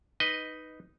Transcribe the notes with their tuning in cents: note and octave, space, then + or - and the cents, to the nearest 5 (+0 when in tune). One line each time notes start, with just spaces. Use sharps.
D#4 +0 B4 +0 D#5 +5